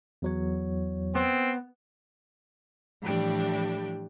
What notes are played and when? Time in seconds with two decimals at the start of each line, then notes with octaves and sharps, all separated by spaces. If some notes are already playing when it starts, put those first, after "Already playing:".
0.22 E2 F#3 C#5
1.15 B3 C4
3.02 A2 E3 F3 G3 D4 G4